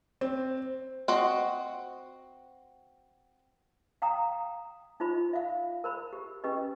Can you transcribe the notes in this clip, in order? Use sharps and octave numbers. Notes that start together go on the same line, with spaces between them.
C4
C4 F#4 D#5
F5 G5 A#5 D#6
D#4 F4 C5 B5
E5 F5
A#4 C5 B5
G4
C#4 G4 B4 D#5